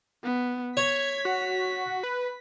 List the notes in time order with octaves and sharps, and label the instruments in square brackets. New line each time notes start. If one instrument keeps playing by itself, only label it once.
[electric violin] B3
[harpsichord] C#5 [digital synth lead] G#6 [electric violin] B6
[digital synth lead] F#4
B4